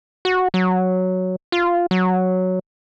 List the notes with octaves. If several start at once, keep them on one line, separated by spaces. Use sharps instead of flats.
F#4
F#3
F4
F#3